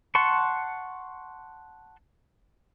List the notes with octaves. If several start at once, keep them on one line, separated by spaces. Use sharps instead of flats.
F#5 A5 C6 C#6